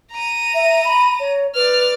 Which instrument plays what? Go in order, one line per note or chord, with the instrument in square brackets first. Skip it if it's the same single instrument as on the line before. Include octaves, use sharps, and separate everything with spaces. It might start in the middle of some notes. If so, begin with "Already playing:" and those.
[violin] A#5 D#7
[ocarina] E5
B5
C#5
[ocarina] B4 [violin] D5 F6